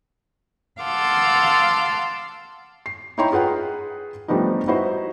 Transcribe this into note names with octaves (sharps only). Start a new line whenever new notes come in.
F5 F#5 A5 C6 D6 E6
C7
D#4 E4 C#5 G5 A#5 C6
F4 G#4 B4 F#5 G5
F3 G3 A3 B3 D4 D#4
D#4 E4 F#4 B4 C5